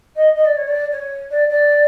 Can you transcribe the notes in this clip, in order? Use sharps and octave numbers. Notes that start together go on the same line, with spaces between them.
D#5
D#5
D5
C#5
D5
C#5
D5
D5